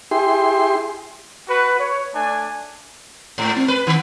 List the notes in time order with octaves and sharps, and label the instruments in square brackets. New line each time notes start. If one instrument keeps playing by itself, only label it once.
[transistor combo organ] E4 G4 G#4 C6
[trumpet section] F#4 B4
C#5
A3 D4 G#5
[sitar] G#2
C4
B4
D#3